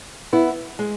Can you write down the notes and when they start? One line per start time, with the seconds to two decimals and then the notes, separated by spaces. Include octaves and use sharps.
0.33 B3 E4
0.79 G#3